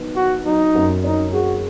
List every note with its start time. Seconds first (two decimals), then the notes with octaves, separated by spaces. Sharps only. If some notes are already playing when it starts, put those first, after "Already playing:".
Already playing: D#3 F#3 B3
0.16 D#3 F#4
0.45 F#3 D#4
0.75 F#2
1.04 C#4 D#4
1.33 F#4 G#4